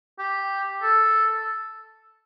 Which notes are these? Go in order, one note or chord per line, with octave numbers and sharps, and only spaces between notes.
G4
A4